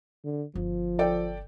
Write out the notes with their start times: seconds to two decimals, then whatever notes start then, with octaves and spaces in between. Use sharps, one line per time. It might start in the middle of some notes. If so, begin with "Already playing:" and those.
0.24 D3
0.55 G1 F3
0.99 A4 D5 G5